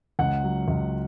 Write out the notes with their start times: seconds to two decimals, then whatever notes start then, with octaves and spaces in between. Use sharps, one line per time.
0.19 C#2 F#5
0.44 F#3
0.68 C#2